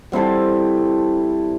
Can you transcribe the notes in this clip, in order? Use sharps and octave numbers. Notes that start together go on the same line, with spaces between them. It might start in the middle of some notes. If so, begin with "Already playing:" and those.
G3 C4 E4 A4